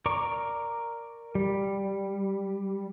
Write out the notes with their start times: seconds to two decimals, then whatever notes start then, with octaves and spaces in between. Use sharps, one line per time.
0.06 A#4 D5 A#5 C#6 D6
1.35 G3